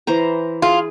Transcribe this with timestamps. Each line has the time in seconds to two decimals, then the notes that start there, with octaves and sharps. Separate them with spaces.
0.07 E3 C5 A#5
0.62 F4 G#4